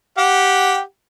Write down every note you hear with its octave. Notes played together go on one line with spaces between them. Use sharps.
G4 F#5 G5